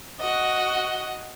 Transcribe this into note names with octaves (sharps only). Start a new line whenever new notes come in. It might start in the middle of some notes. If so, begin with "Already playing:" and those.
F#4 D#5